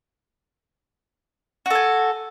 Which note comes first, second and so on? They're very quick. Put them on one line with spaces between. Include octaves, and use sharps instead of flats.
F#4 A4 G#5